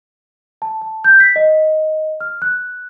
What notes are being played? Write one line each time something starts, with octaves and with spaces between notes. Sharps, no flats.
A5
A5
G6
B6
D#5
F6
F#6